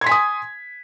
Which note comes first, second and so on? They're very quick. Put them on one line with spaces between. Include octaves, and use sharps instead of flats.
G#6 C6 B6 G#5 D#6